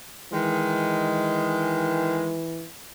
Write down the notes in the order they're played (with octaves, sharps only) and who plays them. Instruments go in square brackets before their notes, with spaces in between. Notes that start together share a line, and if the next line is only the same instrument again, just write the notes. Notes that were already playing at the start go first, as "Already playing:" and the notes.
[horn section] D#3 G#3 [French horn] E3